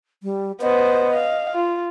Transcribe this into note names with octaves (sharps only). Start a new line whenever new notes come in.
G3
B3 C5 D#5
F5
F4